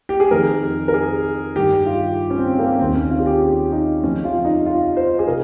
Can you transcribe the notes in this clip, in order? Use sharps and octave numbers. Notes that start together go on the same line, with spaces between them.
G4
G#4
F2 D#3 A#4
A#4
G#4
G2 D#3 G4
F4
C#4
C4
C4
A#3
D#2 D#3 C4
C#4
F4
G#4
G4
G4
D#4
F2 C#3 F3 C#4
F4
D#4
F4
C5
G#4
C3 A#4